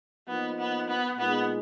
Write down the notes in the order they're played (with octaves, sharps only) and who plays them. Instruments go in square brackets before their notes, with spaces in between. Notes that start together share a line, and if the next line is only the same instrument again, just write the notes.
[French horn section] F3 A#3 D#4 [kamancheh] B3
[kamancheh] B3
B3
[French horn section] A#2 G#3 D#4 G#4 [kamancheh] B3